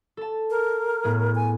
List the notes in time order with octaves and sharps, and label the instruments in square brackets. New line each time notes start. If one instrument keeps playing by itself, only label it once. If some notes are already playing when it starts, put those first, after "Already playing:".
[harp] A4 A5
[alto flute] A#4
[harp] A2 B3 G#4
[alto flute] G#5